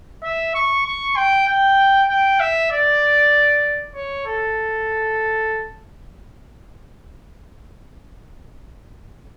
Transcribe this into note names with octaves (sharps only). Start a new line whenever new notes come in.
E5
C#6
C#6
G5
G5
G5
E5
D5
C#5
A4